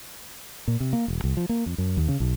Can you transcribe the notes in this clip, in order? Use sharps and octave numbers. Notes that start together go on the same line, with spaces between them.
A#2
C3
A#3
E1
C2
F3
A#3
F2
F#2
D#2
C#3
B1